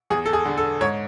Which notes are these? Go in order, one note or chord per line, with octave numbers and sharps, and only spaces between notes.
E2 G#4
A4
G#4
D3
A4
G#2 C#5